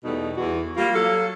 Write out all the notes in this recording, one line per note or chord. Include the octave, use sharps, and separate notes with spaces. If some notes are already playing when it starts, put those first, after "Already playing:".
E2 B2 G3 A3 B3 D#4
E2 E3 F#4
G3 A#3 F4
F#3 A4 F5